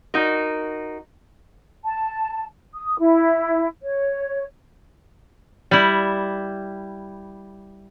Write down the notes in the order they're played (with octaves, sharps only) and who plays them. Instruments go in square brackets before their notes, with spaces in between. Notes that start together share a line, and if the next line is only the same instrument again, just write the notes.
[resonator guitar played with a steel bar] D#4 F#4 A#4
[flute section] A5
D#6
E4
C#5
[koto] G3 E4